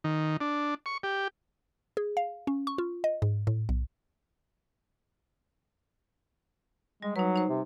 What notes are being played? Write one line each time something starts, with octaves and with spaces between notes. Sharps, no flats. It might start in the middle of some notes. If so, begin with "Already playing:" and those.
D#3
D4
C#6
G4
G#4
F5
C#4
C#6
F4
D#5
G#2
A2
B1
G3 G#3
F#3 D#4 B4
D#4 C5
C3